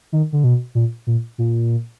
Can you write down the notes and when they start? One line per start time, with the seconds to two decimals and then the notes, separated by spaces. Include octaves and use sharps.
0.12 D#3
0.33 D3
0.44 B2
0.75 A#2
1.07 A#2
1.38 A#2